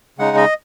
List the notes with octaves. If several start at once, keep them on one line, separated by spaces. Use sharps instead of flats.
C#3 G#3 D#4 F#5
D#5